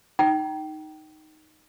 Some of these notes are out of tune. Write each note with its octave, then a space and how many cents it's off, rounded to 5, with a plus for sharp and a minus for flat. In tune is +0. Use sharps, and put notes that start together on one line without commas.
D#4 +0 G5 -20 A#5 +25